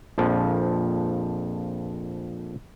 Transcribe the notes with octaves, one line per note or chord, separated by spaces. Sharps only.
A#1 F2 F3